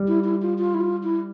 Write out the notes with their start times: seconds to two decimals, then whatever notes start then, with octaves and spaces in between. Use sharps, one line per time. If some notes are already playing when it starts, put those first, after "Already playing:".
Already playing: G3
0.08 E4
0.24 E4
0.42 F4
0.58 F4
0.74 E4
0.81 F4
1.03 E4